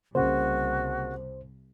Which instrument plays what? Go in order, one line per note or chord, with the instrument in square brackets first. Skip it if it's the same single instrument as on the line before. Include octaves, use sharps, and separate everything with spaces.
[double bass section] C2 [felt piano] C#3 A#3 [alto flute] F#4 [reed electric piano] C5